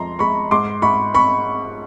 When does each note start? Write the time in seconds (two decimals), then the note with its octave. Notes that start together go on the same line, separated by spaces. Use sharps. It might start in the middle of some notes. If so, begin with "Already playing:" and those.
Already playing: F2 G#3 A#5 C6
0.19 G#3 B5 C#6
0.51 G#2 C6 D6
0.82 G#2 B5 C#6
1.14 B5 C#6